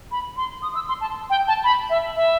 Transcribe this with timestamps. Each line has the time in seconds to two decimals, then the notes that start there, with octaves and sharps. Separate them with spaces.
0.12 B5
0.37 C6
0.62 D#6
0.75 E6
0.88 C6
1.01 A5
1.30 G5
1.48 A5
1.64 B5
1.90 E5
2.16 E5